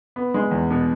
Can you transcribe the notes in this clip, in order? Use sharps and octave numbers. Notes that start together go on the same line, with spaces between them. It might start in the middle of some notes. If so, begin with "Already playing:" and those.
B3
G#3
E2
B2